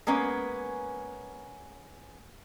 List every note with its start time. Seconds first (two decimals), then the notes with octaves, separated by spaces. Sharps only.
0.07 G#3 A#3 B3 C#4